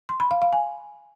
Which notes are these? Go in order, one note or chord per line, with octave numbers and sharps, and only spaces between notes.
C6
B5
F5
F5
G#5